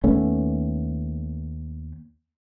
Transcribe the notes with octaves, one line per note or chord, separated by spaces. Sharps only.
D#2 A3 B3 C#4